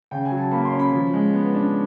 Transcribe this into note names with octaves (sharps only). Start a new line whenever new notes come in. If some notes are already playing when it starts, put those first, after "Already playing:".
C#3 G5
G#5
F#3
A5
A#3 B5
C6
C#4
B5
F3
G#3
B3
D4